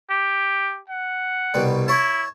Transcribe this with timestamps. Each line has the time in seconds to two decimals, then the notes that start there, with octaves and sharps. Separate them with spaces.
0.10 G4
0.89 F#5
1.54 C2 B2 G3
1.88 E4 C#5 A5